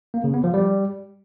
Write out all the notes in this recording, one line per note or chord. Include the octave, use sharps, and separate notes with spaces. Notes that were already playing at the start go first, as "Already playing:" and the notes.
A#3
C#3
B3
F3
G3